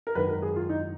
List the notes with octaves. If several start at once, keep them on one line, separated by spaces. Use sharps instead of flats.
A#4
G#1 F#2 D#3 F#3 B4
A#4
G#4
F4
D#4